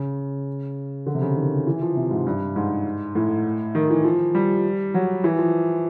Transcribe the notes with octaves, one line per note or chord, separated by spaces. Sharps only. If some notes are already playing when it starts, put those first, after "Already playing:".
Already playing: C#3
D3
C3
C#3
D#3
E3
F3
C3
G#2
G2
G#2
A2
D#3
E3
F3
G3
F#3
E3
F3